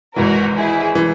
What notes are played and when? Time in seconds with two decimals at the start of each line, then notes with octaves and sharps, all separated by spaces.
0.16 G#1 G#2 E3 F#4 A#4
0.56 E4 G#4
0.95 E3